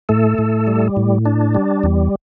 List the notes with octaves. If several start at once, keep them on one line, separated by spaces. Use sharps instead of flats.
A2 A3 A4
A2
G3
A2
D4
G3
E2